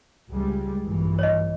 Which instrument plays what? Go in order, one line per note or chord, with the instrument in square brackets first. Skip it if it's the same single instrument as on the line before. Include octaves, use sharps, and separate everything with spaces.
[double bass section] C#2 G3 G#3
A#1 G2 E3
[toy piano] C#5 D#5